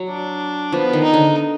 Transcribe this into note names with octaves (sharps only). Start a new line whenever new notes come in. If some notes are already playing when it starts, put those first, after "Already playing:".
Already playing: F#3
D4
F3 B3
D#3
D#4
D3